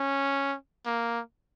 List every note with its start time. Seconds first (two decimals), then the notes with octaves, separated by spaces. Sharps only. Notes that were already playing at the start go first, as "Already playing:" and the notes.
Already playing: C#4
0.86 A#3